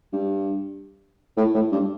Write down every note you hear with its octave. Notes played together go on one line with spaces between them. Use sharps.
G2
A2
A2
G2